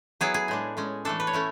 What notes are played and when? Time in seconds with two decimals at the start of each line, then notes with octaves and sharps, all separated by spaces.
0.21 F#3 B3 E4 G#4
0.34 G#4
0.48 A2 G#3 D4
0.77 A2 G#3 C#4
1.05 E3 A3 D4 A4
1.20 B4
1.27 C#5
1.33 A3 C#4 E4